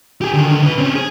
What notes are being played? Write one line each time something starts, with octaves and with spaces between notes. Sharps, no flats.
G4 G#4
D3 D#3
C#3 B4
C4 C#4
G#4